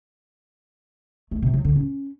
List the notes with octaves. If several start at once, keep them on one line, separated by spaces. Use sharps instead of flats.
A3
C3
F#3
D3
C#4